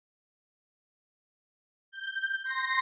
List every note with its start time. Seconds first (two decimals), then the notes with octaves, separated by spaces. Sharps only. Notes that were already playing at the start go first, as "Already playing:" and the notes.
1.91 G6
2.44 C6 A#6